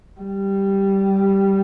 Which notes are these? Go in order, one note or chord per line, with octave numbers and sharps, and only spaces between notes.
G3